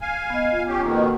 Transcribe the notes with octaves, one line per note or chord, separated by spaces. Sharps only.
F5 G#5
B3 D#5
F4
C#4 G4
F2 B2 D#3 A#3
F#4 F#5